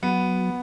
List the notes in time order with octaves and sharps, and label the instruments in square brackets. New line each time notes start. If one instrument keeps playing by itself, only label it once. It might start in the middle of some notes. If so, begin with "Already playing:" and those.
[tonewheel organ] F#3 [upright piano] B3